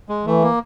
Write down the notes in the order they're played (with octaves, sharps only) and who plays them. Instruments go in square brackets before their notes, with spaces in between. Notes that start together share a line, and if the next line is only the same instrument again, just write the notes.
[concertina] G#3
[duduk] E3 [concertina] A3
[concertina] A#3